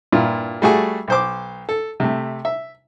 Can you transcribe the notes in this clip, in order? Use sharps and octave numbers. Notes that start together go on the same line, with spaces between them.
G2 A#2 E4 F4
G3 A3 F#4 G#4
B1 C5 D6
A4
C3 A3
E5